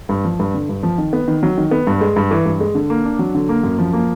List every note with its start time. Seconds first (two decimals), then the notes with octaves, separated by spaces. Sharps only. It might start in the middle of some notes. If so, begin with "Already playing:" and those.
0.09 G2
0.25 F3
0.39 G2
0.54 D3
0.69 G2
0.83 F3
0.98 D#3
1.13 B3
1.28 D#3
1.43 F#3
1.58 D#3
1.71 B3
1.87 G2
2.01 G#3
2.16 G2
2.31 E3
2.46 G2
2.60 G#3
2.75 D3
2.90 A#3
3.05 D4
3.19 F#3
3.34 D3
3.49 A#3
3.63 F#2
3.79 F3
3.93 A#3